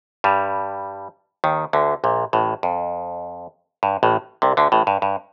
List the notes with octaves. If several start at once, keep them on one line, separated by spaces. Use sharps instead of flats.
G2 G3
D#2 D#3
D2 D3
A#1 A#2
A1 A2
F2
G2
A1 A2
C2 C3
D2 D3
A1 A2
G2
G2